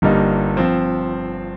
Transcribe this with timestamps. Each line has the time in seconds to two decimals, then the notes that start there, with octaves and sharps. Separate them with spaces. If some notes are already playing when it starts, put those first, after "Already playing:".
0.02 G1 G2 G3 A#3 D#4
0.57 F3 C4